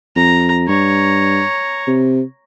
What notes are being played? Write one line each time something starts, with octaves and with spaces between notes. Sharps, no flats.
F2 A#5
G2 C#5 A#5
C3